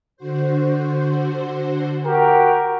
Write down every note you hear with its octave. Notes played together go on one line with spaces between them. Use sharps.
D3 F#4 C5
F#4 G4 A#4